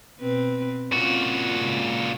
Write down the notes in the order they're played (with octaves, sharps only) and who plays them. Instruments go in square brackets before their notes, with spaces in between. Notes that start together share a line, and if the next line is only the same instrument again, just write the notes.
[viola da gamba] B2 C4 B4
[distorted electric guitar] A#2 F#4 [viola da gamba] C4 C#4 F4
[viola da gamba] G#2 C#3